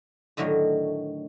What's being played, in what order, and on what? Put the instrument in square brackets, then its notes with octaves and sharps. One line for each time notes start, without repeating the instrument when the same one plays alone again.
[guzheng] A2 D3 D#3 F#3 A3